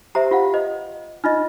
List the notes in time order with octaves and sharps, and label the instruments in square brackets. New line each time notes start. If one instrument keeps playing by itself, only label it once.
[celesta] G4 C5 E5 [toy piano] A#5
[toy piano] F4 [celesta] G4 F5 F#5
[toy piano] C5 [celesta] D#5
[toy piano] D#4 F4 D#5 [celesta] F6